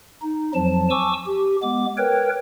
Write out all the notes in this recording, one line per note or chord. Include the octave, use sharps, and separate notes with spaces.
D#4
F2 F3 F#3 A5
G#5 A5 C#6 D6 E6
G4
G#3 B3 D6
A#4 B4 C#5 G5